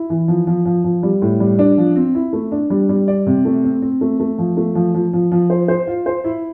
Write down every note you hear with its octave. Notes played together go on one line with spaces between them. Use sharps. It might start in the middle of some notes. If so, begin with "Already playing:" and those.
Already playing: E4
E3
F3
F3
F3
F3
G3
A2
G3
D4
F3
C4
E4
A3
D4
G3
G3
D5
C3
A3
C4
C4
A3
A3
F3
A3
F3
F3
F3
F3
C5
C5
F4
C5
E4